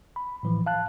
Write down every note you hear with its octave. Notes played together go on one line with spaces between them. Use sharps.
B5
A2 E3 F3
F5 A5 F#6